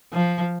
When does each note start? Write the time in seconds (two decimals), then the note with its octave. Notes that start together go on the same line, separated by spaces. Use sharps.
0.13 F3